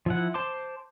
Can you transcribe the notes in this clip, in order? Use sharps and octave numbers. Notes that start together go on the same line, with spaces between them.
F3 E4 F#5
C5 A5 C6 D6